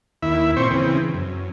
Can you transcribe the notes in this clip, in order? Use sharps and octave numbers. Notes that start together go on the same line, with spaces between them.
D#2 E4 E5
A#2 C4 C5 C#6
C#3 E3 C4
F#2